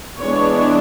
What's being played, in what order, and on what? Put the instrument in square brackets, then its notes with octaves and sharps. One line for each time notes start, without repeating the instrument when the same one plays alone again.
[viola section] E3 G#3 B3 D4 C#5